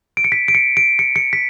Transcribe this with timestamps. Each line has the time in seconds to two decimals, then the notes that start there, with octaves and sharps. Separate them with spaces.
0.17 D7
0.24 C#7
0.32 B6
0.48 D7
0.55 C#7
0.77 D7
0.99 C#7
1.16 C#7
1.33 B6